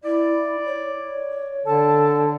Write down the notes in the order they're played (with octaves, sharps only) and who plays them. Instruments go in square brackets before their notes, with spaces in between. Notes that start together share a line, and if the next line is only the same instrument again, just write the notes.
[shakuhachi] E4 [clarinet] D5
[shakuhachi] C#5
[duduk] D3 [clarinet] A4 [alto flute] A5